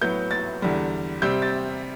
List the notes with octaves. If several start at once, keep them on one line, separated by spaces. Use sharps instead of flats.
A2 F#3 B3 G6
A6
E2 D3 G3
C3 G3 C4 G6
A6